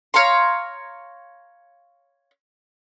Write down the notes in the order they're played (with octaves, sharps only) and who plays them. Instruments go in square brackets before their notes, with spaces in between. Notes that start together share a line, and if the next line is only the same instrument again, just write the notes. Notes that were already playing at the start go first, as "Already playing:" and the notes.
[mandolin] C#5 F5 A#5 C6